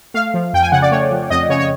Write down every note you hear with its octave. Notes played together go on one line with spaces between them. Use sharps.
A3 F5
F3
F2 G5
G#5
C#3 F#5
D5
A3 C#5
F3
F2 D#5
C#3 C#5
C#5